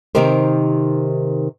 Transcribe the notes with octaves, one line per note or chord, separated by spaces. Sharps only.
C3 D#3 D#4 G4 A#4 C5